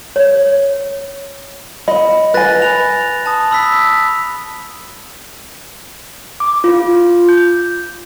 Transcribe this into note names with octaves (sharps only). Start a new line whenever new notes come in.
C#5
D#5 B5
B4 G#5 F#6 A6 A#6
F7
A5 D#6
B5 E6 B6
D6
F4
G6